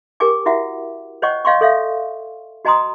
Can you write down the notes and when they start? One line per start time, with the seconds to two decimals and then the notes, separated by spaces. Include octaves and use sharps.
0.20 G4 A#4 G5 G#5 D6
0.46 E4 F#4 E5 F#5
1.22 C5 C#5 D#5 F#5 G5 C#6
1.45 C#5 D#5 F5 G5 C6 C#6
1.61 A4 C#5 E5 F5
2.65 F#4 D#5 G#5 A#5 C6 D#6